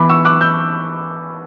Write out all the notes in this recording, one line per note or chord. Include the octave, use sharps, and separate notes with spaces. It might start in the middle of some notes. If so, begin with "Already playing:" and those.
Already playing: E3 B3 B5 D6
C#6 E6
D6 F#6
E6 G6